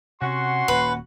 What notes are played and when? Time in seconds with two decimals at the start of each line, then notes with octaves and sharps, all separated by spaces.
0.22 C3 C#4 F#4 F#5 C6
0.68 D#1 A#3 B4